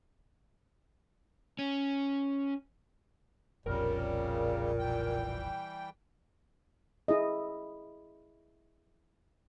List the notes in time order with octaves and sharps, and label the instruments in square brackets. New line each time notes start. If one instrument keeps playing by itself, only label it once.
[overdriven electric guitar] C#4
[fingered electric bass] F1 B1 F2 [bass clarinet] A#2 [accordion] C#3 G3 [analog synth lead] A#4
[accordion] E3 G3 G5
[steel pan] E4 G#4 D#5